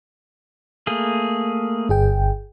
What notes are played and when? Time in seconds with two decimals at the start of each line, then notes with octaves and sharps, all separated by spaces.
0.87 A3 A#3 G#4
1.89 G1 G#4 G5